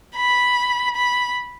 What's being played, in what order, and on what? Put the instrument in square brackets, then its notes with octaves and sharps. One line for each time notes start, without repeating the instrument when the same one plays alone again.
[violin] B5
B5